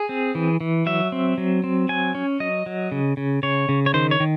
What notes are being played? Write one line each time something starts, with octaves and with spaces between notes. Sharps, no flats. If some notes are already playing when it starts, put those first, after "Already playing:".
Already playing: G#4
C4
E3
E3
F#3 E5
C4
F#3
C4
F#3 G#5
C#4
F#3 D#5
F#3
C#3
C#3
C#3 C#5
C#3
C#5
D#3 C5
C#5
D#3